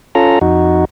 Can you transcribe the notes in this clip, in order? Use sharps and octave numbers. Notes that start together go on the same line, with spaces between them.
C#4 F4 A4 A#5
F2 D#4 F#4